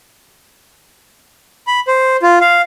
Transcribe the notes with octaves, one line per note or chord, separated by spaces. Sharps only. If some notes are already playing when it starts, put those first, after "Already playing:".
B5
C5
F4
F5